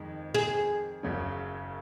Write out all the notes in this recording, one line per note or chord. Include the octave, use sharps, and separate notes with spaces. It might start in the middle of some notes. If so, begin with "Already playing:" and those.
Already playing: F2 D#3 G#3
G#4
F#1 F#2 C#3 F#3 C#4